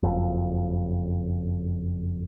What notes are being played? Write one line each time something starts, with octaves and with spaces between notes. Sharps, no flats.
F#1 F2